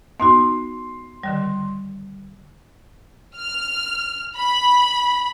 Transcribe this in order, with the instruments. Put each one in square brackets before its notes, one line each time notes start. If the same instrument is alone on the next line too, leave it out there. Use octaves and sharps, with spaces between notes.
[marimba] B3 D#4 F#4 [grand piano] C6
[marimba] D3 D#3 G3
[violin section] F6
B5